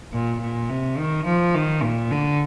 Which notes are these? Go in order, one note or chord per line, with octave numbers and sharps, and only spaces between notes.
A#2
A#2
C3
D#3
F3
D#3
A#2
D3